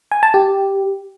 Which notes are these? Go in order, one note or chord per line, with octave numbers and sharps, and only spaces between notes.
G#5
A5
G4